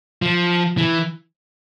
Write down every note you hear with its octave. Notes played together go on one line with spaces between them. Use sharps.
F3
E3